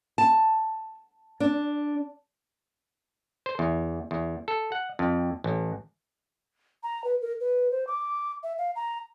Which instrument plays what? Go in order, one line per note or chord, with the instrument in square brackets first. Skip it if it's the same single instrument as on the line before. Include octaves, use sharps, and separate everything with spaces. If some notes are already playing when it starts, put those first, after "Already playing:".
[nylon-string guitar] A5
D4
[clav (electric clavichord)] C5
E2
E2
A4
F#5
F2
A1
[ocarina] A#5
B4
A#4
B4
C5
D6
E5
F5
A#5